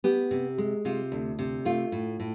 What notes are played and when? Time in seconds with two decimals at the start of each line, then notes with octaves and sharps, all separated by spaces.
0.04 B3 G4
0.31 C3
0.58 G#3
0.85 C3 F4
1.12 D2
1.39 C3
1.65 A3 F4
1.92 A2
2.20 A2